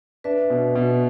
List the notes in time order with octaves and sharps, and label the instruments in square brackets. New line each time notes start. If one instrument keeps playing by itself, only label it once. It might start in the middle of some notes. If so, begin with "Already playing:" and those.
[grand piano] D4 [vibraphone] B4 E5
[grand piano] B2
B2